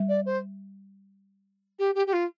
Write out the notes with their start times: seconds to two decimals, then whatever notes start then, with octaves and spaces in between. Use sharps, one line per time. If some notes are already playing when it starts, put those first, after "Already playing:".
Already playing: G3
0.08 D5
0.26 C5
1.79 G4
1.95 G4
2.07 G4
2.13 F4